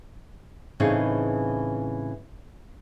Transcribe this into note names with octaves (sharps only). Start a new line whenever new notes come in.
A2 C#3 E3 C4 D#4 G#4